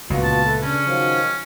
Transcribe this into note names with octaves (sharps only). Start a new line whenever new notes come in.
C#2 A#2 C#3 B3 F4 F#4
A5
A4 B4 E5
C#3 C#4 D4
D#3 F3 F#3